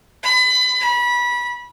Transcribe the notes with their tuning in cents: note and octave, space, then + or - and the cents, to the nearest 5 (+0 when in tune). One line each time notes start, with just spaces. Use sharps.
B5 +30
B5 -25